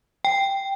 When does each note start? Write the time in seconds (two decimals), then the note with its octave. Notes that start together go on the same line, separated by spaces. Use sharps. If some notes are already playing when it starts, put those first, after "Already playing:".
0.25 G5